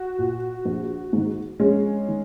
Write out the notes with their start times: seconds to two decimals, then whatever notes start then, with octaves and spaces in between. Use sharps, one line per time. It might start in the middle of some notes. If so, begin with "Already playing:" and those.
Already playing: F#4
0.19 A#2
0.65 A#1
1.13 G#2 D#3
1.60 A#1 G#3 C#4
2.08 D#3